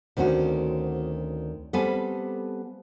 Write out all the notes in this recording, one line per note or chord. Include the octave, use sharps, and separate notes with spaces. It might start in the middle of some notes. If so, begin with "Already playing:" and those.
D2 D#3 C4 C#4 F#4
G3 B3 C4 A4 F5 G#5